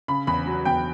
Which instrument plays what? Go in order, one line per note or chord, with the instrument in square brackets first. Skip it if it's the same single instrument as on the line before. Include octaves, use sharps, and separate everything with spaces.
[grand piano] C#3 [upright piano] B5
[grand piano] E2 [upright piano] B5
[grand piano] F#3
[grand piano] E2 [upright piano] G5